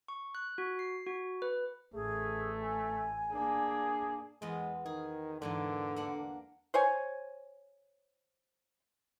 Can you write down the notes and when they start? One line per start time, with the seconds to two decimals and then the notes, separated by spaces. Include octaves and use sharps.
0.08 C#6
0.35 F#6
0.58 F#4
0.79 C7
1.07 F#4
1.42 B4
1.94 A1 A3 G#4
2.61 G#5
3.32 A#3 D4 G#4
4.42 E2 G#3 B3
4.86 D#3 G#4
5.42 G#2 D3 E3 A#3
5.96 A#3 D4 F#5
6.74 C5 C#5 G#5